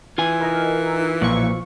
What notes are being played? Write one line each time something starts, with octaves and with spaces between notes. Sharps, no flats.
E3 F4 G#5
D#4 A#4
B1 A#2 F3 C#6